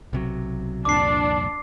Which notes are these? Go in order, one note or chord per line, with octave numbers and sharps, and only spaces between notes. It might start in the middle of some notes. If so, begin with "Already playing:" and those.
B1 C3 F#3
C2 F2 A#2 D4 D6 C7